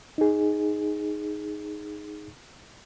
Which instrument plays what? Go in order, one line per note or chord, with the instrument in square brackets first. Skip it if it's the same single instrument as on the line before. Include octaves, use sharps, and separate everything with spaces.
[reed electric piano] D#4 G#4